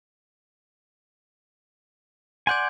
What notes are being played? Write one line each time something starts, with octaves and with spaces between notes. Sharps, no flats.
D5 F#5 G#5 C6 G6 G#6